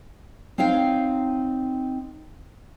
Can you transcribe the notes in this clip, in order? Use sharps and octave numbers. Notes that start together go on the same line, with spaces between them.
C4 D#4 C#5 F5 G5